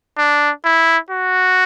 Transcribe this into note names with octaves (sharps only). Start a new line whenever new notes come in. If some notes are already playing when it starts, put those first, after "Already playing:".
D4
E4
F#4